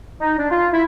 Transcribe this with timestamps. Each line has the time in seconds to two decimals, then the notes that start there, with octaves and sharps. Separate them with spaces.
0.20 D#4
0.39 D4
0.51 F4
0.73 E4